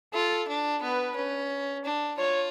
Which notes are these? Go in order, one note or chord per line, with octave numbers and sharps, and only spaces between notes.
F4 A4
D4
B3 B4
C#4
D4
F4 C#5